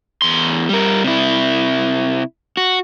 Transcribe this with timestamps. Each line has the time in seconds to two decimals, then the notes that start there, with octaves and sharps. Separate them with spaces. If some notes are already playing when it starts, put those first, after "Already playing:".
0.22 E2 C6
0.69 G3 A#4
1.04 C3 E4
2.57 F#4